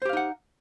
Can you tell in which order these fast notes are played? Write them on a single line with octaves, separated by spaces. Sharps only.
C5 G4 F5 D#4 F#5